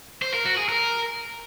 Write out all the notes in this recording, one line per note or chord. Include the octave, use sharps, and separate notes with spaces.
C5
A#4
F#4
G#4
A#4